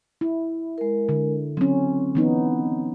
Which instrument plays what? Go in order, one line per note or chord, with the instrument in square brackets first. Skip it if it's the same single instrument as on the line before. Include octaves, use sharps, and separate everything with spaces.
[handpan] E4
[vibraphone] G#3 A#4
[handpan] D3
[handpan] F#3 C#4 [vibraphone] C4
[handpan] E3 B3 D#4